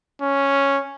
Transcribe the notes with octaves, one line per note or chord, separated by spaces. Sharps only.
C#4